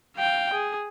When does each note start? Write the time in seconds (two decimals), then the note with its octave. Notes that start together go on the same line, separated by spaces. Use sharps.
0.17 F5 G5
0.53 G#4